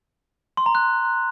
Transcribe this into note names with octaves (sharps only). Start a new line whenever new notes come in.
C6
A#5
F#6